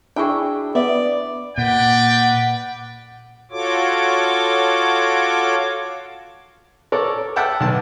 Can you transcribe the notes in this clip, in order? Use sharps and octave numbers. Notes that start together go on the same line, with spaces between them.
D4 E4 F#4 G#4 G5
B3 D5 E5
A#2 B4 D5 F#5 G5
F4 F#4 A4 C#5 D6
A4 A#4 C#5 D5
E5 F#5 G5 A5 D6 F6
B1 A5